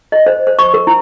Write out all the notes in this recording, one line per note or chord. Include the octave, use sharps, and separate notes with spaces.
D#5
C5
C5
C#6
A#4
E4